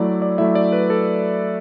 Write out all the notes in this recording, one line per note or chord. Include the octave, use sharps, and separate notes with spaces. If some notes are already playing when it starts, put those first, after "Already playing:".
Already playing: F#3 A3 E4 D5
D5
F#3 A3 E4 E5
D5
B4
A4